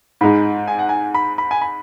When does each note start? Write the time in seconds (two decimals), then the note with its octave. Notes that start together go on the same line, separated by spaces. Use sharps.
0.21 G#2 G#3 D#4 B5
0.68 G#5
0.79 F#5
0.89 G#5
1.14 B5
1.38 B5
1.51 G#5
1.62 B5